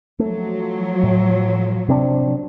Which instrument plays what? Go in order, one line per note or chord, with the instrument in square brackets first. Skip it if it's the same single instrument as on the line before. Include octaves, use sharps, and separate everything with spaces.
[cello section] F3 F#3 [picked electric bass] A3
[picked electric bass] A2
C3 C4 D4